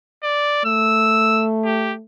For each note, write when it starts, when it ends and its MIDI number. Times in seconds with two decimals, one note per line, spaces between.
0.24 0.61 74
0.65 2.03 57
0.65 1.46 88
1.65 1.93 67